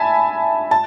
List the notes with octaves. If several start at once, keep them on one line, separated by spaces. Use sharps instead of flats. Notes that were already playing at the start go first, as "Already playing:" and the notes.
Already playing: E5 G#5 A5 B5
A5